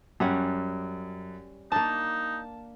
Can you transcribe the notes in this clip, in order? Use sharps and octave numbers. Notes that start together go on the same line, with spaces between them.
F#2 G3 C#4 F#5
A#3 D4 D#4 A5